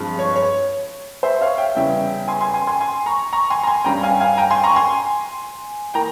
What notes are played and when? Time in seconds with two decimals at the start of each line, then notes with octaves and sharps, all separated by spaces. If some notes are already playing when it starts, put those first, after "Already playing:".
Already playing: G2 F3 G#3 C4
0.19 C#5
0.36 C#5
1.23 C5 E5
1.41 C#5 F5
1.58 E5 G5
1.75 E2 C#3 G3 C#4 E5 G5
2.28 G#5 C6
2.41 G#5 C6
2.54 G#5 C6
2.67 G#5 C6
2.80 G#5 C6
3.06 A#5 C#6
3.33 A#5 C#6
3.50 G#5 C6
3.63 A#5
3.67 G#5 C6
3.85 G2 G3 C#4 G5 A#5
4.03 F5 G#5
4.20 F5 G#5
4.37 G5 A#5
4.51 G#5 C6
4.63 A#5 C#6
4.76 G#5 C6
5.94 E3 A#3 G5 A#5